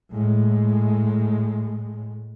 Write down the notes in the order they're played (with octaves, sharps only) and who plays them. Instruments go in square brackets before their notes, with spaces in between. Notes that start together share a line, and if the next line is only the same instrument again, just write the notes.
[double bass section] A2 G#3